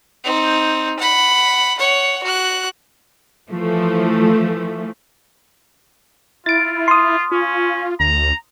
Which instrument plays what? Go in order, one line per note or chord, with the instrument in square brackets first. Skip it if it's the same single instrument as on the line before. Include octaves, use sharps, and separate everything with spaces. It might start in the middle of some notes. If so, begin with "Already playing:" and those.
[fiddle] C4 D#4
F#5 B5
C#5 F#5
F#4 F#6
[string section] E3 F3 A3
[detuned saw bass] E4 [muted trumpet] F4 [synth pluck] A6 D7
[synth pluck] C6 D#6
[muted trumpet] C#4 [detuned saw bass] F4
[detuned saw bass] D2 [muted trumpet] A#5